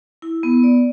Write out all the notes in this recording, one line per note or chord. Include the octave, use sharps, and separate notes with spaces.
E4
B3
D5